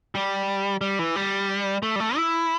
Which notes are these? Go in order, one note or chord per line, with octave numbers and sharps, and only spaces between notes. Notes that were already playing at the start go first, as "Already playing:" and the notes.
G3
G3
E3
G3
A3
G3
A3
E4